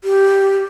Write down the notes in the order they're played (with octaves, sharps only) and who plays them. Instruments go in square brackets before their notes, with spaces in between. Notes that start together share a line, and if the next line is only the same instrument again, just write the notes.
[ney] G4